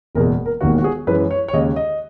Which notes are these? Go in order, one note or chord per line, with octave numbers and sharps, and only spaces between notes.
F#1 E2 B2 G#3 A#4
A#4
E1 D#2 D#3 A#3 F#4
F#4
G#4
F#2 E3 G#3 B4
C#5
C#5
D#2 C#3 G#3 D#5
D#5